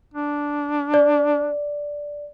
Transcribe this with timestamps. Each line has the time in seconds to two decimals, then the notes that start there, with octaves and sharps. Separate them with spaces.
0.14 D4
0.94 D5